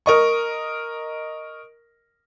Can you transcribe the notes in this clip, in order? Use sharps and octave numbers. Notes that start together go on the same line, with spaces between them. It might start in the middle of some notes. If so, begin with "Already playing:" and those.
A#4 D#5 C#6